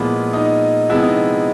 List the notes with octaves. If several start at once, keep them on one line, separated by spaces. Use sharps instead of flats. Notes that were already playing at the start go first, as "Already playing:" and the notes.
Already playing: A#2 F3 G#3 B3 E4
D#4
C3 F3 G#3 B3 E4
D#4